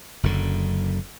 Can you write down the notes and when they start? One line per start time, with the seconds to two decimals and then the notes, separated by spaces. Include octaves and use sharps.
0.23 F#1 F#2 D3